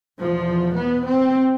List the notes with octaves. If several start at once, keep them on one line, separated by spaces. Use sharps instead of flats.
E2 B2 F3
B3
C4